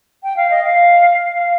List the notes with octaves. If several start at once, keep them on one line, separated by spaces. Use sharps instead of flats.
G5
F5
D#5
F5
F5